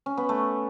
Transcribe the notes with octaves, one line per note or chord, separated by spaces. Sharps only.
C#4
B3
A3